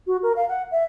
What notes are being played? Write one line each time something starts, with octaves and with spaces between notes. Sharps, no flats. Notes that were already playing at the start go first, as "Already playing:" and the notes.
F#4
A#4
F5
F#5
E5